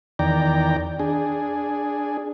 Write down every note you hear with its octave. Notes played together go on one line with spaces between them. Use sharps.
E2 D#3 D5 G5 A#5
D4 G#4